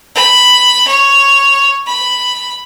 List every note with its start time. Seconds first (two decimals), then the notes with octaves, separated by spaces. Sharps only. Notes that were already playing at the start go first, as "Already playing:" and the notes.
0.15 B5
0.88 C#5
1.87 B5